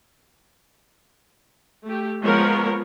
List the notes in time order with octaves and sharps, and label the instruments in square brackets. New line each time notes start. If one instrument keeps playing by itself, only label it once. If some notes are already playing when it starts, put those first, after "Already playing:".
[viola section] A3 G4
F3 G#3 B3 A#4 C#5